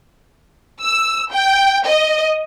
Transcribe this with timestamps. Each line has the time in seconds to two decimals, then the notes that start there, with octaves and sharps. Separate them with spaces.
0.84 E6
1.33 G5
1.86 D#5